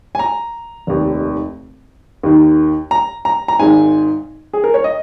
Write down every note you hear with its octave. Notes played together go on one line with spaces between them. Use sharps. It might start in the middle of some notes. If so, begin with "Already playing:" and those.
G#5
A#5
F1 D#2 D#3
D#2 D#3
A#5
A#5
A#5
G#1 G#2 D#3 G#5
G#4
A#4
C#5
D#5